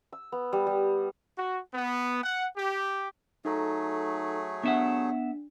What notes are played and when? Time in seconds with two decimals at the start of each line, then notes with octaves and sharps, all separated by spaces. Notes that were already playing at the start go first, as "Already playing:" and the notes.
0.12 E6
0.32 B3
0.53 G3
0.67 G3
1.38 F#4
1.74 B3
2.22 F#5
2.57 G4
3.45 F#3 A3 D#4 G#4 A4 A#5
4.64 B3 D4 E5 F#5